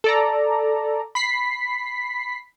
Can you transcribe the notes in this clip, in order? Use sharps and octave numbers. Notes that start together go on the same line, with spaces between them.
A4 D5 A#5
B5 B6 C7